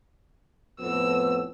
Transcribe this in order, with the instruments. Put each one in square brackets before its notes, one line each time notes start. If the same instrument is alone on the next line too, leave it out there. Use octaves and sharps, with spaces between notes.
[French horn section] F2 A2 B3 [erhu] E6